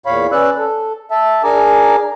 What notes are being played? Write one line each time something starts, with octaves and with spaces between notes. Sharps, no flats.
E2 A#2 C#5 F5 B5
C#4 B4 D5 E6 F#6
A4
E5 A5
D4 G#4 A#4 G#5 A#5 D6